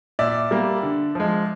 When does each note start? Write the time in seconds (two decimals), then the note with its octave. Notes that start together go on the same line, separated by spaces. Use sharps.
0.19 A#2 D5 E5
0.51 G3 A#3
0.83 D3
1.15 F3 G#3